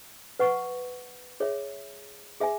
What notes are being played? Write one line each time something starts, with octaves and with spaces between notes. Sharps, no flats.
B4 F#5 C#6
G#4 C#5 E5
G#4 E5 G#5